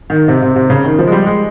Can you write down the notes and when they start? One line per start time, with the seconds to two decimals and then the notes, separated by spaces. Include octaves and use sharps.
0.10 D#3
0.28 C3
0.42 C3
0.56 C3
0.70 C#3
0.84 D#3
0.99 F3
1.08 G#3
1.12 G3
1.26 G#3